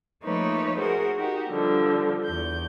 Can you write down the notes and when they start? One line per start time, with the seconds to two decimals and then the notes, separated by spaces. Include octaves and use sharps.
0.23 F3 A3 A#3 D#4 B4 C#5
0.79 F#4 G#4 A#4 C5
1.18 D#4 F#4 G4
1.51 G2 D3 F3
2.26 E2 G6